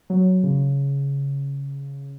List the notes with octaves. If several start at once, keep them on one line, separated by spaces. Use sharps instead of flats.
F#3
C#3